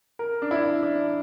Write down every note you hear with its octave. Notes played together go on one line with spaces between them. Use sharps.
A#4
D4
E4
D4